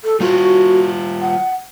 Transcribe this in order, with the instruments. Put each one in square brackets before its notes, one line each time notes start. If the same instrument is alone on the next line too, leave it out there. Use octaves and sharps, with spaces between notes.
[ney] A4
[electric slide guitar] G3 F4 [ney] F#4
[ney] F#5